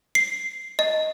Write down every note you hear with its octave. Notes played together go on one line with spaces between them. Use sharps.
C7
D#5